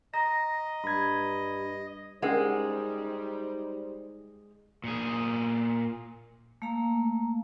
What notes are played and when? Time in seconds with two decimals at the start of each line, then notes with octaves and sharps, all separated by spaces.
0.14 D#5 A#5 A#6
0.84 G2 B5 G#6
2.22 G3 G#3 C#4 D#4 A#4 C5 F#5
4.84 A#2 G#4
6.62 A3 A#3 F5 A#5